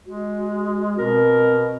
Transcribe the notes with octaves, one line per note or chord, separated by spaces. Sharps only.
G#3 F#4
B2 C4 A#4